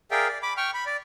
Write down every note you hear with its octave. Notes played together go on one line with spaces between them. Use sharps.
G#4 A#4 D5 E5 F5 G5
D5
B5 D6
G5 C#6 F6
B5
D5